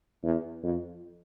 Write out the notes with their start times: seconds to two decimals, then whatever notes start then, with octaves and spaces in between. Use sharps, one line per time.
0.24 E2
0.63 F2